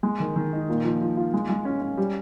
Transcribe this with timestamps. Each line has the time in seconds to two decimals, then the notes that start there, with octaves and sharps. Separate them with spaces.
0.03 G#3
0.20 D#3
0.36 D#3
0.53 D#4
0.69 A#2
0.84 F3
1.01 F3
1.17 F4
1.34 G#3
1.49 G#3
1.65 C#4
1.81 C#4
1.97 G3